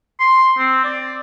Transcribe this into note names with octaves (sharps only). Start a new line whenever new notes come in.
C6
C4
D5